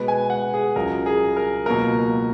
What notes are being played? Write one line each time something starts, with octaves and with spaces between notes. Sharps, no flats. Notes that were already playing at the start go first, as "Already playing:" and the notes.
Already playing: B2 G#3 B3 B4
G#5
F#5
G#4
C#2 C#3 F#3 A#4
G#4
A#4
C#2 B2 F#3 A#3 A#4